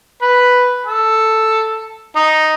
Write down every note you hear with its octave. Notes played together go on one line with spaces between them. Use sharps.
B4
A4
D#4